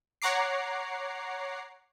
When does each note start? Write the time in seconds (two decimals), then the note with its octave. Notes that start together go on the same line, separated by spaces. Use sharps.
0.22 C#5 F#5 A#5 D6 C7